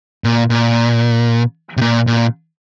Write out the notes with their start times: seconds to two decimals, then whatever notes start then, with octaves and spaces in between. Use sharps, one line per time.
0.24 A#2
0.50 A#2
1.77 C3
1.81 A#2
2.07 A#2